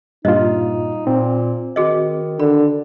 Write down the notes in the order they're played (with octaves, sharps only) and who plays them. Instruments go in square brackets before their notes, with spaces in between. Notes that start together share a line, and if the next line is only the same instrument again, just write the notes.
[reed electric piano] G2 A#2 F4 [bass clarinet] D#4 [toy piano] D#5
[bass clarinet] A#2 [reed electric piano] C4
[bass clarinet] D#3 [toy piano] F#4 G#4 D#5
[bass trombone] D3 [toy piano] B5